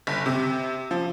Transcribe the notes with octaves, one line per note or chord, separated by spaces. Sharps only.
G1
C3
F3